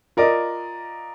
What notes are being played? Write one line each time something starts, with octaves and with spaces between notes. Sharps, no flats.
F4 A#4 D5 D#5